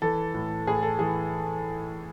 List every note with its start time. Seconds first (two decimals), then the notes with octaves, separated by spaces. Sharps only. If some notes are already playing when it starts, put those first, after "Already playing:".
0.02 E3 A4
0.34 A2
0.67 A2 G#4
0.83 A4
0.99 E3 G#4